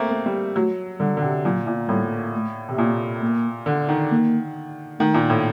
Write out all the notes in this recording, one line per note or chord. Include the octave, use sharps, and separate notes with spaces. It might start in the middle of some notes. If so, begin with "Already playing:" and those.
Already playing: A3 A#3 C4
A3
G3
F#3 A3
D3 G3
D3
C3
A#2 F#3
A#2
A2 G3
A3
C3
A#2 A#3
A#3
D3
D#3
A#3
D#3 A3
A#2
A2